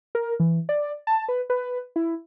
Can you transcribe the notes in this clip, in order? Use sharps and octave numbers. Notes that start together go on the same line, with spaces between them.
A#4
E3
D5
A5
B4
B4
E4